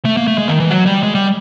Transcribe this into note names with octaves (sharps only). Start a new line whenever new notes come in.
A3
A#3
A3
G#3
D#3
E3
F#3
G3
G#3
G3